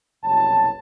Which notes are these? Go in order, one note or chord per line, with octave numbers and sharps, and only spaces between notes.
F#1 C2 B2 C#5 A5